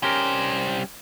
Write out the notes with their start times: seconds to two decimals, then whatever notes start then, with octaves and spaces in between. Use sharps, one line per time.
0.03 G3 C#4 G4 A#4 C5